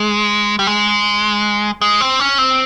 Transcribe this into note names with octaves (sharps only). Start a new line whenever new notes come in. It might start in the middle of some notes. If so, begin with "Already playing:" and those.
Already playing: G#3
G3
G#3
G#3
C4
C#4
C4